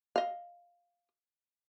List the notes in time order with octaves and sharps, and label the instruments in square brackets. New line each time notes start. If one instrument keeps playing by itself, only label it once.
[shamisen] D#5 F5